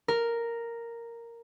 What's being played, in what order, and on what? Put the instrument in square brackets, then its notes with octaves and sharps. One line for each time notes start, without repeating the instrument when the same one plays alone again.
[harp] A#4